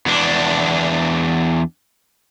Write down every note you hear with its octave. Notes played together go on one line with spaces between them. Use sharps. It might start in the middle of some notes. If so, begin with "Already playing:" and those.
E2 D4